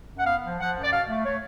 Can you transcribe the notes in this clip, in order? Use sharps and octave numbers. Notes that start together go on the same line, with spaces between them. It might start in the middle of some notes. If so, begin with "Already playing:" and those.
F#2
F#5
B3 F5
F3
F3 F#5
F#2
D5
B2 F5
A3
A3 C#5